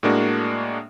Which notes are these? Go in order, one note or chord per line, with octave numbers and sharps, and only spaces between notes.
A2 G#3 A#3 D4 F#4